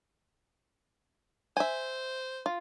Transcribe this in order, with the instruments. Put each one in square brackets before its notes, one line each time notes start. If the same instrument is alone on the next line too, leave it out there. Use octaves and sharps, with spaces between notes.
[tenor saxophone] C5 [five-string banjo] E5 G#5
[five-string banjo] F4